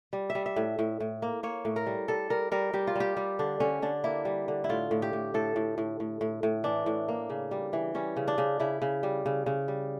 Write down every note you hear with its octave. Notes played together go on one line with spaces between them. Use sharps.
G3
E5
G3
E5
A2
A2
A2
A#3
A#3 C#5
A2
A#4
G3
G3 A4
G3 A#4
G3 A#4
G3 G4
F4
G3 G4
G3
D3 D4
D3 C#4
D3 D4
A#3 E4
G3
D3
E4
A2 F4
A2
G4
A2
A2 A4
A2
A2
A2
A2
A2
E3 D4
A2
A#3
C#3
G3
E3
G3 C#4
C#3
D4
C#3
C#3 E4
C#3
G3
C#3
C#3
G3